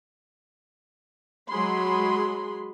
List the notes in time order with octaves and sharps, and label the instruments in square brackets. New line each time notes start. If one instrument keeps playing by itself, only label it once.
[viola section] F#3 G#3 G#4 B5 C6